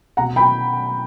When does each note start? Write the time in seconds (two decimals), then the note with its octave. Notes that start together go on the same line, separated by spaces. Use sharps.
0.17 B2 F#5 A#5
0.36 G5 B5